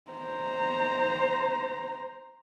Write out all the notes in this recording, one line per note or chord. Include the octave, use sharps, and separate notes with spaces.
C5 A#5